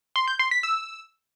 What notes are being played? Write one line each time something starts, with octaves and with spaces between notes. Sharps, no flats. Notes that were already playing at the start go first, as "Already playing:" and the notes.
C6
G6
C6
B6
E6